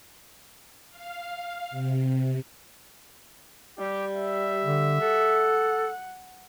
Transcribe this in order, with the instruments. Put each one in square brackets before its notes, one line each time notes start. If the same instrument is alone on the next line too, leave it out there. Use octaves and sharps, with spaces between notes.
[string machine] F5
C3
[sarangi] G3 [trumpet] G4
[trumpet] E5
[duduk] D3
[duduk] A4 [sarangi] F#5